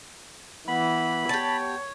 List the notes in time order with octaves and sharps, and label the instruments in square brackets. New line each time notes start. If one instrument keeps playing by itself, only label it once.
[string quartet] E3 [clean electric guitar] B3 [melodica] B5
[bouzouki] G4 A5 [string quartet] C#5